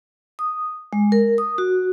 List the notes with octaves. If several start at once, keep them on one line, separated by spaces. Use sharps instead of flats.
D#6
G#3
A#4
D#6
F#4